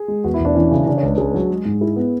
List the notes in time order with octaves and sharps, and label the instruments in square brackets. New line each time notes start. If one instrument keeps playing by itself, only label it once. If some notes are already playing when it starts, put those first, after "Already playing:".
Already playing: [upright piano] G#4
[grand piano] G#3
[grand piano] E2 [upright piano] F#4
[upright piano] E4
[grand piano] E1
[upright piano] D4
[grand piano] E3 [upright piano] C#4
[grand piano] C#3 [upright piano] C#4
[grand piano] C#3 [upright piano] D4
[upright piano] C#5
[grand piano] C#2 [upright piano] B4
[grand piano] C#2 [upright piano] G#4
[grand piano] F#3
G#3
G#2
[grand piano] E4 [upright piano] G#4
[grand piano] B3